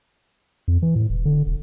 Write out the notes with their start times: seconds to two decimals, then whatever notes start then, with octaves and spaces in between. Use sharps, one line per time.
0.68 F2
0.82 E3
0.96 A2
1.10 E1
1.25 D3
1.47 D#1